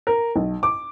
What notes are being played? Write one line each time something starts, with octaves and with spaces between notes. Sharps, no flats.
A#4
B1
D6